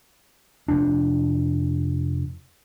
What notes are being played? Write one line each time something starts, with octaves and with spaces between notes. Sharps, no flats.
F1 F2 D4